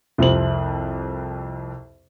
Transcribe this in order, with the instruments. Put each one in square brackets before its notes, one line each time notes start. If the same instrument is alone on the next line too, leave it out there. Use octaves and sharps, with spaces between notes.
[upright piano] C2 F2 C4 F#7